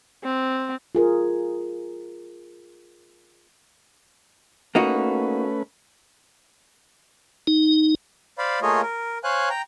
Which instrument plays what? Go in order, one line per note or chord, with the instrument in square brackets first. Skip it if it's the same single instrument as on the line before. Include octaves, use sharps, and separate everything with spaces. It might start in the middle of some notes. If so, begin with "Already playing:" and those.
[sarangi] C4
[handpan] F4 G#4 A#4
[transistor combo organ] A3 C#4 B4 [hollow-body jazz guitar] A#3 D#4 F#4
[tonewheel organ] D#4
[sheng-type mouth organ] C5 D5 F5 B5
A3 A#3 F4 G#4 C#5 D#5
A#4
C5 C#5 F5 G#5 F#6
G5 A#5